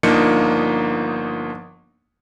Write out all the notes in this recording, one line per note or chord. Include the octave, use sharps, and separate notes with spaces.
G1 F3 A#3 D4 D#4 C#7